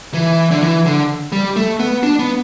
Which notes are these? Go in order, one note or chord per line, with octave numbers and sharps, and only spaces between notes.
E3
D3
E3
D3
G3
A3
B3
D4
B3